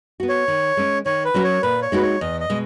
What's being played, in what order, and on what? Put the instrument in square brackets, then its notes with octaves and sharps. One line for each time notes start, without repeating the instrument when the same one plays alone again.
[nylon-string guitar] B3 F#4
[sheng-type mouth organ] C#5
[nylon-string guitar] D#3
G#3 C#4
[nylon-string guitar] D#3 [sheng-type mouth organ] C#5
[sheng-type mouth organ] B4
[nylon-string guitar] F#3 C#4 F#4 A#4
[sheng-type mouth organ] C#5
[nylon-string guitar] A#2 [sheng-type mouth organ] B4
[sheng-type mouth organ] C#5
[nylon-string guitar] G#3 D#4 F#4 [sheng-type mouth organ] B4
[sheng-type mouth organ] C#5
[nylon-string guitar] E2 [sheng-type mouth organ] D#5
[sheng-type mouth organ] D#5
[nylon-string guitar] B2 G#3